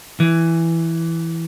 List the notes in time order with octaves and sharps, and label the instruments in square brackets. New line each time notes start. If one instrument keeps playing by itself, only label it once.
[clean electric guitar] E3